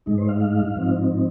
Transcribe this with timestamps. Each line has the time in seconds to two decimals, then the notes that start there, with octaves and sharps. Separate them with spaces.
0.06 G#2 G#3 D#4
0.18 C5
0.29 F5
0.40 F5
0.76 G#2 F3 C4 D#4